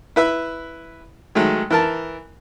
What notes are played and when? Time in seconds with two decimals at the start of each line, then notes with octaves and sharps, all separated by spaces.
0.16 E4 B4 E5
1.35 D#3 F#3 G#3 A3
1.70 E3 A#4 A5